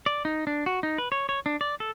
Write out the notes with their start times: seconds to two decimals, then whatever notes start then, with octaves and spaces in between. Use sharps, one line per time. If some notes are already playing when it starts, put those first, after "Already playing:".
0.06 D5
0.25 D#4
0.47 D4
0.66 F#4
0.83 D#4
0.98 B4
1.12 C#5
1.29 C#5
1.46 D4
1.61 D5
1.80 A4